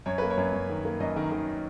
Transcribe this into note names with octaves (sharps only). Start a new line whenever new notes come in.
F#2 C#5
A#3 B4
C#5
F#2
F#2
D#3
A#3
F#2 D#5
D#3
D#3